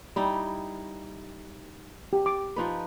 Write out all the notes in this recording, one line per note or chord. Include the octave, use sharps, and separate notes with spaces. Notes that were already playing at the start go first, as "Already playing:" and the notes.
G3 D#4 E4
G4
D6
F3 D#4 B4